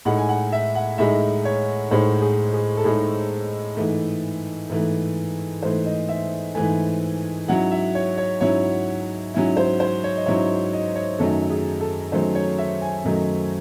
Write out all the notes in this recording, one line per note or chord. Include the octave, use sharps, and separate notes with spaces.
A2 G#3 D#4 F#5
G#5
F#5
E5
F#5
A2 G#3 D#4 E5
C#5
A2 G#3 D#4 C5
G#4
G#4
A4
A2 G#3 D#4 G#4
G#2 E3 A3
G#2 E3 A3
G#2 E3 A3 C5
D#5
E5
G#2 E3 A3 G#5
G#2 F#3 C#4 E4 F#5
E5
C#5
C#5
G#2 F#3 C#4 E4 C#5
G#2 F#3 C#4 E4
C5
C5
C#5
D#5
G#2 F#3 C#4 E4 C#5
D#5
C#5
F#2 D#3 F#3 A3 D#4 A4
G#4
A4
F#2 D#3 F#3 A3 D#4 C5
C#5
E5
G#5
F#2 D#3 F#3 A3 D#4